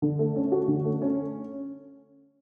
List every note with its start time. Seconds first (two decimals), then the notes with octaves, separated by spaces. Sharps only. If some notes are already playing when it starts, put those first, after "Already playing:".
0.02 D3
0.19 A3
0.36 C#4
0.52 F#4
0.68 D3
0.84 A3
1.02 C#4